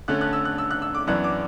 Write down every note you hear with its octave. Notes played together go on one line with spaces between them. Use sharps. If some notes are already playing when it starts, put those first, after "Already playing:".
D3 A3 C#4 F#6
F#6
E6
F#6
E6
F#6
E6
D6
F#2 E3 B3 D4 F#6
D6